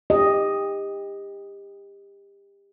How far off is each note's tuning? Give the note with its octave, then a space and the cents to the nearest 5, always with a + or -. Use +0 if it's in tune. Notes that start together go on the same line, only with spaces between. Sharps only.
G4 +30 D#5 +0